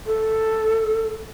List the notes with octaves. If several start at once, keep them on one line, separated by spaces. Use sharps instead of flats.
A4